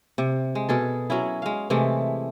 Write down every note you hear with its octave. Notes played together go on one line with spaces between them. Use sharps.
C3
G#3
B2 G#4 A4
F#3 C#4 E4
G#3 F5
C3 E3 G#3 A3